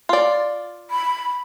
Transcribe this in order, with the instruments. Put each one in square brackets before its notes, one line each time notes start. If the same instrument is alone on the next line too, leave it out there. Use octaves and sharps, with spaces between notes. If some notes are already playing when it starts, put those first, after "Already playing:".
[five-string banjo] F4 D5
[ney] B5